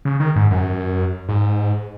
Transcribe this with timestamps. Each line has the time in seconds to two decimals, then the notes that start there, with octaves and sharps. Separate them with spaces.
0.05 C#3
0.20 D#3
0.36 G#2
0.51 F#2
1.29 G#2